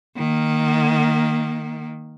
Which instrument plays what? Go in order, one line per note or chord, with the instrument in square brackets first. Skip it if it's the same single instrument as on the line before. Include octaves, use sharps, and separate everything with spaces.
[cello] D#3 A#3